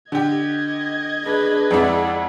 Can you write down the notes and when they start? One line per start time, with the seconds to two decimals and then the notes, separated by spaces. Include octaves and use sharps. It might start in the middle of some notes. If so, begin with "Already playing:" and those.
0.12 D3 G4 D#5 G#6
1.24 D4 G#4 B4
1.71 F2 G#3 E4 D5 F#5